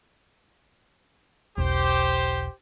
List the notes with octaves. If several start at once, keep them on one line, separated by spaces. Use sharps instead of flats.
E1 B1 G4 C5